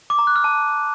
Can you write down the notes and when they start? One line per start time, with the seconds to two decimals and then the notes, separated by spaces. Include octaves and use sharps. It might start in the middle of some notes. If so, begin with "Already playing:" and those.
0.10 D6
0.19 A#5
0.27 F#6
0.36 F6
0.44 A5